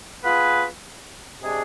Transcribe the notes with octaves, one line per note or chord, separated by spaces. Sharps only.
B3 F4 G#4 B4
C3 G#3 D4 G#4